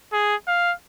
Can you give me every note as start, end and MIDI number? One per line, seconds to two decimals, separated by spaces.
0.13 0.36 68
0.48 0.73 77